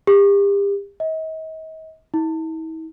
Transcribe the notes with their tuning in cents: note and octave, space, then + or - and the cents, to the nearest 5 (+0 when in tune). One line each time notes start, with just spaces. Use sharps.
G4 +35
D#5 +40
E4 -45